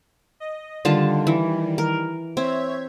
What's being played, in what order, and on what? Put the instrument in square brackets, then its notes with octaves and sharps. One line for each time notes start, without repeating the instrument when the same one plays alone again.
[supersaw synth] D#5
[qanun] D3 F4 A5 [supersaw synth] D#3 G3
[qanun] E3
A#4
[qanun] C4 [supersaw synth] C#5 E5 G#6